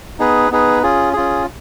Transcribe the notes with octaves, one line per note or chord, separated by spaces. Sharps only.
B3 D#4 G#4 B4
B3 D#4 G#4 B4
C#4 F4 G#4
C#4 F4 G#4